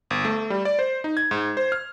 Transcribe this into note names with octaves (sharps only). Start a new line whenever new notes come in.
G1
A3
G3
D5
C5
D#4
G#6
G#2
C5
F6